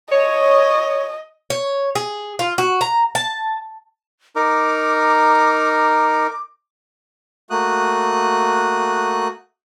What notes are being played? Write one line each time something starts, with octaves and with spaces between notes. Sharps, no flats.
C#5 D#5
C#5
G#4
F4
F#4
A#5
A5
D#4 A#4 D6
A3 A#3 F#4 D#6 F#6